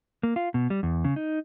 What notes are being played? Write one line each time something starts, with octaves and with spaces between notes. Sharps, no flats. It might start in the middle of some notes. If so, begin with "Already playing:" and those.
A#3
F4
B2
G3
E2
C#3
D#4